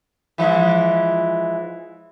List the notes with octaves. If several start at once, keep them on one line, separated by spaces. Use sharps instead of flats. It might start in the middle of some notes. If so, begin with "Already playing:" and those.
E3 F3 G#3